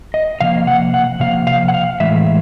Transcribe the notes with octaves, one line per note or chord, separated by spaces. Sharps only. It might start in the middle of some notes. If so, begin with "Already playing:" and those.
D#5
C3 F3 A#3 F5
F#5
F#5
C3 F3 A#3 F5
F5
F#5
F5
A2 E3 G#3 E5